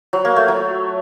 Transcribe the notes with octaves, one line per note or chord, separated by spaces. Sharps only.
F#3
A#3
A3
F#3